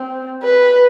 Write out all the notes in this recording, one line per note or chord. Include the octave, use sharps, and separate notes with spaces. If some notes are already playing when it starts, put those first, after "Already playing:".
Already playing: C4
B4